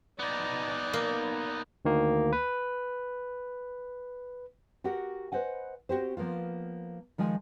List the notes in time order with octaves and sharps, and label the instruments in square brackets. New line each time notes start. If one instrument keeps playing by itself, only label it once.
[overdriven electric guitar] B3 D#4 [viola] D5
[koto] A#3
[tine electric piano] D2 D#3 A#3
B4
[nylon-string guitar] F#4 G4 A#4 F#5
B4 C5 D#5 F#5 G#5
C4 F#4 G4 C5
F3 A#3 B3 F4
D#3 F3 G#3 F4 G#5